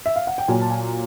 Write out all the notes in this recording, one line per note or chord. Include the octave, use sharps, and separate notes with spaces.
E5
F5
F#5
G5
A#2 F#3 G#5
A5
G#5